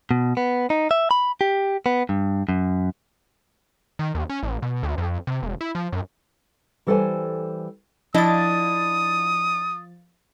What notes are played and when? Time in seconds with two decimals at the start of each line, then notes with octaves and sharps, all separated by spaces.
0.11 B2
0.37 B3
0.70 D#4
0.91 E5
1.11 B5
1.41 G4
1.86 B3
2.09 G2
2.49 F#2
3.99 D#3
4.15 D#2
4.30 C#4
4.43 A1
4.62 B2
4.83 D2
4.98 F2
5.27 C3
5.43 E1
5.61 E4
5.75 F3
5.93 F#2
6.87 E3 G3 A4 B4 C5 G#5
8.14 F3 D4 E4 D#5 D#6 A6